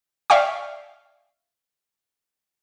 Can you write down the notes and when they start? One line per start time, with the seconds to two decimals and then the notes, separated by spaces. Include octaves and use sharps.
0.30 D5 E5 F5 G5 C#6